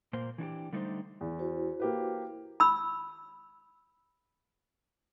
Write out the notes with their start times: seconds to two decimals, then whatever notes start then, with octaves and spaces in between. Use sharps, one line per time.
0.13 A#2 A#3 C5
0.38 E3 D4 F#4 G4
0.73 D3 G3 A3 D#4 B4 C5
1.21 E2
1.39 E4 F#4 C5
1.80 A#3 G4 B4
2.60 B5 E6